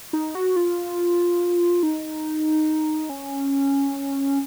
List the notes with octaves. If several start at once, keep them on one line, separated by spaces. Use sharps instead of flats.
D#4
F#4
F4
D#4
C#4